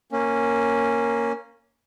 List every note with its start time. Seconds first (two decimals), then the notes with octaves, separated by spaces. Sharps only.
0.12 A#3 C#4